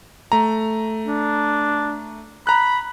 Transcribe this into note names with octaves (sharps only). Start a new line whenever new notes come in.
A3 A#5
D4
A#5 B5 F#6